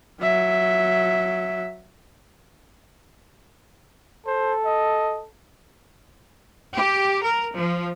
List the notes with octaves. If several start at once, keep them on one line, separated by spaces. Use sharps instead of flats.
F#3 E5
A4 C5
D#5
G4
A#4
F3